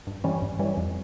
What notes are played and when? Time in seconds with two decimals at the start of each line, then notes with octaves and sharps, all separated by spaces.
0.07 G2
0.24 E3 G3 C#4
0.42 G2
0.59 E3 G3 C#4
0.77 F2